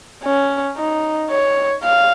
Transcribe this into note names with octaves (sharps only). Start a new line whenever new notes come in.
C#4
D#4
C#5
F5